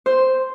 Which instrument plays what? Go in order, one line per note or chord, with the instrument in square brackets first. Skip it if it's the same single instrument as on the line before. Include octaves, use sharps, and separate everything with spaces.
[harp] C5